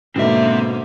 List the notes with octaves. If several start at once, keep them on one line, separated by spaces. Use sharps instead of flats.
G#2 B2 D3 A#3 C4 E5